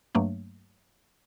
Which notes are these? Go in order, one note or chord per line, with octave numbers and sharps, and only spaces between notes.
G2 F#3 A3 A#3